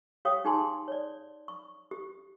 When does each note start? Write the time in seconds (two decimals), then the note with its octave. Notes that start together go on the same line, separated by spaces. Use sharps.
0.25 G4 C#5 F5 G5 D#6
0.45 D#4 G4 G#4 G#5 A5 C6
0.88 C#5 D5
1.48 C#6
1.91 G4